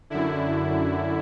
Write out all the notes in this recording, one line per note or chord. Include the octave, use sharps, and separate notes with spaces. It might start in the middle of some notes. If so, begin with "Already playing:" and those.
F#2 D3 E4